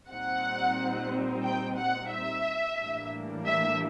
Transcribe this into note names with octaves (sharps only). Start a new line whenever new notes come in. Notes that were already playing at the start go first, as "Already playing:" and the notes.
A#2 G3 C4 D#4 F#5
G5
F#5
E5
A2 E3 G3 A#3 D4
E5